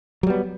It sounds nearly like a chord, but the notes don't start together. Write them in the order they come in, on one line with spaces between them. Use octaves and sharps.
F#3 G3 B3